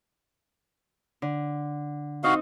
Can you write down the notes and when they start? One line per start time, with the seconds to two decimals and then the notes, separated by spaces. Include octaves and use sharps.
1.22 D3
2.24 C4 D#4 F#4 D#5 F5